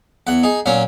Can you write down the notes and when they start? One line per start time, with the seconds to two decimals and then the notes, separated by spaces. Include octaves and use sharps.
0.27 E2 F#5
0.43 D#4 G#4
0.66 A#2 F#3 C#4